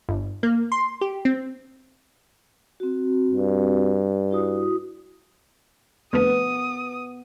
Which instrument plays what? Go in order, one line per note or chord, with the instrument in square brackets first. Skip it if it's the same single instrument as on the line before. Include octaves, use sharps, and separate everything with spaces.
[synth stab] G1
A#3
C6
G4
C4
[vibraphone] C4 F#4
[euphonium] G2
[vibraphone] E4 F#4 D#6
[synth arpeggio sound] F2 D3 A3 [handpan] B3 [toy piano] A#4 B4 [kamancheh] D#6